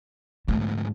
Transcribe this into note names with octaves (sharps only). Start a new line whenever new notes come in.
D2 G#2 A3